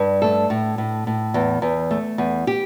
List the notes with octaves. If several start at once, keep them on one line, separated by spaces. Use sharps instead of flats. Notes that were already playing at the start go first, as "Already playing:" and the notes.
Already playing: G2
A3 A4
A2
A2
A2
E2
E2
A3
E2
G4